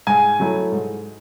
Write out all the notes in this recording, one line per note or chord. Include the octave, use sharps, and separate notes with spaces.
G#2 G#5
F#3 A3 E4
G#2